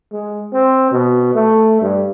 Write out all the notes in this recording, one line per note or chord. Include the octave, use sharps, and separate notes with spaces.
G#3
C4
B2
A3
G2